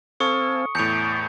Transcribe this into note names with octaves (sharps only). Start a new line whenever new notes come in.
C4 A4 F5 G#5 C#6 D#6 C#7
E2 A2 A5 D6 G6 C#7 F7